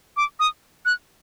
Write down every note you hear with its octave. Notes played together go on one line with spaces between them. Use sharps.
D6
D#6
F#6